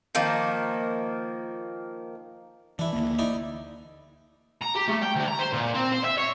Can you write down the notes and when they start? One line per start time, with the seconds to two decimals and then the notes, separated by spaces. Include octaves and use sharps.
0.15 D#3 F3 A#3
2.79 E3 D4 E4
2.93 D2 A#3
3.19 D#4 E4 D5
4.62 A#5
4.76 G4
4.88 A3
5.03 G5
5.16 D2
5.28 A#5
5.39 C5
5.53 A#2
5.74 C4
5.92 C5
6.04 E5
6.18 C#5